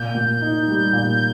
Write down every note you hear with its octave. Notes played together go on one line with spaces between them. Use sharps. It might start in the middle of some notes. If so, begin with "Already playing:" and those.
Already playing: A#2 G6
A#2
D#4
G3
A#2